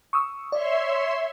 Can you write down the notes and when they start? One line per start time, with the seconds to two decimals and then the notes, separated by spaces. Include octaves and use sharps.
0.13 C#6 D#6 E6
0.52 C#5 D5 E5 C6